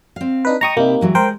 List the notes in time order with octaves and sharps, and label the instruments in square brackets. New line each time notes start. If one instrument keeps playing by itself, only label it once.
[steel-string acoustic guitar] C4 F5
[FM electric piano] D4 D#4 B4
[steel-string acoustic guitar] D#5 G5 [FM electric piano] A#5 C#6 D#6
[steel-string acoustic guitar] C3 E4 G4 [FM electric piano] A#3 D#4
[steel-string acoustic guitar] E3 F#3 G#3
[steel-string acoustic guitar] G#3 [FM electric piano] A#4 C5 G5